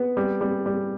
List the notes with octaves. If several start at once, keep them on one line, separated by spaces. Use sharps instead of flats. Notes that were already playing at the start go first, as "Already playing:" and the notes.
Already playing: B3
G3
G3
G3